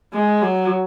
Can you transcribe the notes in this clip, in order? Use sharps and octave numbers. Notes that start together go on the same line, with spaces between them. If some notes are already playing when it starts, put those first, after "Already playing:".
G#3
F#3